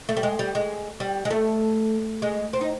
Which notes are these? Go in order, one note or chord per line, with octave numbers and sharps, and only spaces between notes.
A3
G3
G#3
G3
G#3
G3
G#3
A3
G#3
C4
D#4